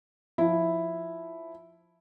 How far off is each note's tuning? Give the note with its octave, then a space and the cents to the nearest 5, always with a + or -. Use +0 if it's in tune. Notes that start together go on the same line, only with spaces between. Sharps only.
F3 +0 E4 +0